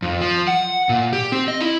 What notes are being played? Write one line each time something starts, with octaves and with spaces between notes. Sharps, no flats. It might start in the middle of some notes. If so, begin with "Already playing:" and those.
F2
F3
F#5
A#2
G4
C4
D#5
E4